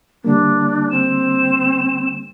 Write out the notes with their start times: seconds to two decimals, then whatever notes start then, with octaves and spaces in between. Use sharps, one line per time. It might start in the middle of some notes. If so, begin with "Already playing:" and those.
0.24 D3 G3 A#3 D4
0.91 C4 E7